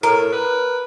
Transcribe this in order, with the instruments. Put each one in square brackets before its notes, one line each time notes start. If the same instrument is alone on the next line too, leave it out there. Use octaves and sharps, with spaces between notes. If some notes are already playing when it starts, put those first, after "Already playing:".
[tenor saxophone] A2 [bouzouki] A#4
[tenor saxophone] B4